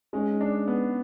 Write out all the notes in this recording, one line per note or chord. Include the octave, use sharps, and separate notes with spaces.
G#3 C#4 D#4
D4
B3